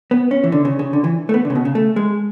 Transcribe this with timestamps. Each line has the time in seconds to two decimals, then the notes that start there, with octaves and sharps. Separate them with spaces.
0.11 B3
0.31 C#4
0.44 E3
0.52 D3
0.65 C#3
0.79 C#3
0.93 D3
1.04 E3
1.29 A3
1.34 B3
1.45 D3
1.50 C#3
1.55 B2
1.65 C#3
1.75 A3
1.96 G#3